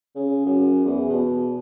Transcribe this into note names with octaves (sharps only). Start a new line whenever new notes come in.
C#3
F#2
E2
B2